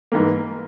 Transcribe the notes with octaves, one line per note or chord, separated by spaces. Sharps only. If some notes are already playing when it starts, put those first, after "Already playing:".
G#2 E3 A#3